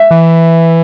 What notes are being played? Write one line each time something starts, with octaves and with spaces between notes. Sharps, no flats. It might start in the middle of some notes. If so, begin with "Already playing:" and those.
Already playing: E5
E3